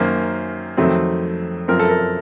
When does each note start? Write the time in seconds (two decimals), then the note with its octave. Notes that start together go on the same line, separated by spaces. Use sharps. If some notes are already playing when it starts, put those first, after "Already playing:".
Already playing: F#2 D#3 A#3 C#4 C5
0.77 F2 D#3 F#3 A3 C4
1.68 F#2 F3 C4 A#4
1.79 A4
1.89 A#4